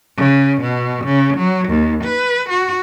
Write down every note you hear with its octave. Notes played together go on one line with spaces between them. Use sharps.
C#3
B2
C#3
F#3
D#2
B4
F#4